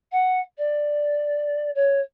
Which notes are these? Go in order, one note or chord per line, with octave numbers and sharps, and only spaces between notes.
F#5
D5
C#5